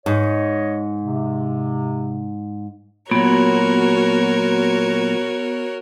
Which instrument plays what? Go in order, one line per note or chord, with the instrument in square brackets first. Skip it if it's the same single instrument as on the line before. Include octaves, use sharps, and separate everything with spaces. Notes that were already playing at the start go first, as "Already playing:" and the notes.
[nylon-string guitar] G#2 [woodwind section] C#5 D#5
[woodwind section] C3
[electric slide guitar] A#2 F#3 [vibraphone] B3 [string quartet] F#4 A#4 C#5